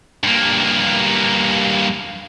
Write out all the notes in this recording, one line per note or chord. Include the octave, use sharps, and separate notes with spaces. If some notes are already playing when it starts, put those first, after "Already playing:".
G2 A#3